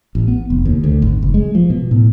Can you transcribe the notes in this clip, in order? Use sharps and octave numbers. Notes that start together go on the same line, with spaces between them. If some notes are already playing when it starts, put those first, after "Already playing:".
A1
B3
F1
D#2
D2
G#1
F#1
G#3
F3
B2
A2